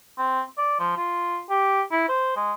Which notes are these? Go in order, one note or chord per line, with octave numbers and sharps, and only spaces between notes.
C4
D5
F3
F4
G4
E4
C5
G#3